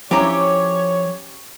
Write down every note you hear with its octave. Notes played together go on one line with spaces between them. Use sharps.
F3 C#4 E4 G4 C#5 A#5